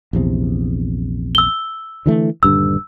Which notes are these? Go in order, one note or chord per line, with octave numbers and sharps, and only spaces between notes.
A#1 E2 C3
E6 G7
D3 E3 A3
D#1 G2 D3 E6